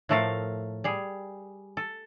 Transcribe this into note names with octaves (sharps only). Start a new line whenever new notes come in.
A2 F3 A3 A4 A#4 F5
G3 G#4
A4